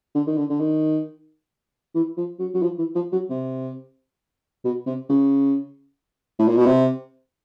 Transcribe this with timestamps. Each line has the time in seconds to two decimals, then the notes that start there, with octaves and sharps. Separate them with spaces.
0.15 D3
0.27 D#3
0.38 D3
0.50 D3
0.60 D#3
1.95 E3
2.17 F3
2.39 F#3
2.54 F#3
2.63 F3
2.78 E3
2.95 F3
3.12 F#3
3.30 C3
4.64 B2
4.86 C3
5.09 C#3
6.39 A2
6.48 A#2
6.57 B2
6.66 C3